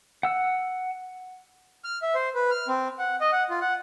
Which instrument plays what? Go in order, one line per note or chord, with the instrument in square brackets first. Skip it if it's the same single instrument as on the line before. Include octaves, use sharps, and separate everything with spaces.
[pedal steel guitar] F#5 E6
[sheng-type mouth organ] F6
E5
C5
B4
F6
C4
F#5
D#5
F#5
F4
F#5